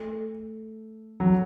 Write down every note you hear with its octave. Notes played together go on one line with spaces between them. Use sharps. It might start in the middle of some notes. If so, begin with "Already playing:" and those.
Already playing: A3
F#3